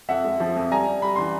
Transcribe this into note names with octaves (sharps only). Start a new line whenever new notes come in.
F2 E5 F#5
G#3
F3
F2
G3 G#5 A#5
G3
G3 B5
E3 C6